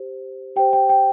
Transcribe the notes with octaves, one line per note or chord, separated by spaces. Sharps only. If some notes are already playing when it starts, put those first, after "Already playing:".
Already playing: G4 C5
G4 C5 G5
G5
G5